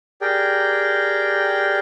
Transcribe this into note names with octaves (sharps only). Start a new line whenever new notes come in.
G4 G#4 A#4 D5 G5